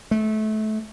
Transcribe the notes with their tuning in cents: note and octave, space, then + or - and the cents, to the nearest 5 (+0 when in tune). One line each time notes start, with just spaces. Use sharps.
A3 -25